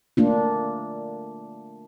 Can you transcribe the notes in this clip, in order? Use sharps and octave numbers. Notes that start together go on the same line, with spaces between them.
A3 A#3 D4 F4